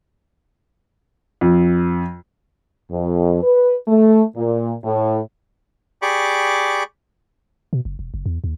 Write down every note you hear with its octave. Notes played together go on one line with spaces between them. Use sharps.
F2
F2
B4
A3
A#2
A2
G4 G#4 D5 B5 C#6 D6
B2
F#1
E1
F#1
E2
D#2